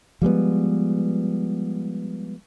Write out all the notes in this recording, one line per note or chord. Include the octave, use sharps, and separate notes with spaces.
F3 G3 G#3 B3